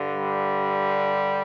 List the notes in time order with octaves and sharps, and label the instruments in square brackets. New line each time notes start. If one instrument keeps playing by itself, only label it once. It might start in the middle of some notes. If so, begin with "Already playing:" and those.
Already playing: [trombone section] G2 D3
G3